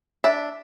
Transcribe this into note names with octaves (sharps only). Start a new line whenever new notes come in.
D4 E5